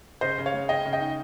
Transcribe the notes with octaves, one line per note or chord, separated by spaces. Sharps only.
C#3 C5 D#5
C#3
C#5 F5
G#3
C#3 D#5 G5
C#3
D#5 G5
D#4